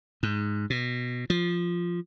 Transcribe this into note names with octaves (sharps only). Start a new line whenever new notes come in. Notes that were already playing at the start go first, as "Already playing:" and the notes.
G#2
B2
F3